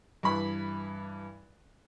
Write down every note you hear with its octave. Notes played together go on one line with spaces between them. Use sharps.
G2 E3 B5